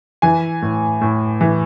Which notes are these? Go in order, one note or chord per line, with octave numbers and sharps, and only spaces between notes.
E3 G#5
A2
A2
E3